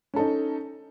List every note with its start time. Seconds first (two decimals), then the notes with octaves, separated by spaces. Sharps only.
0.14 C#4
0.16 A4
0.19 D#4